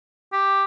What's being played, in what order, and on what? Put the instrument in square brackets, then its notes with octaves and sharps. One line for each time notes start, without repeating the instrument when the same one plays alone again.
[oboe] G4